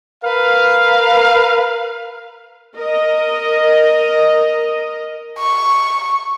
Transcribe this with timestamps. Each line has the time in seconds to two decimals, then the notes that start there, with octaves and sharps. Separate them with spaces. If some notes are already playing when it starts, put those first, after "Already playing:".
0.24 A#4 B4 F5
2.76 A#4 D#5
5.39 C#6